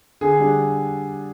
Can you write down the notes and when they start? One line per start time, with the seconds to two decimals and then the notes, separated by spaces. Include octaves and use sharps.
0.21 D3 G#4
0.39 G3 D4